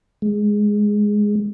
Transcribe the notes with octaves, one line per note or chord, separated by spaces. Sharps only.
G#3